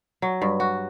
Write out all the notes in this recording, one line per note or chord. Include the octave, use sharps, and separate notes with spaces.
F#3
G2
F#4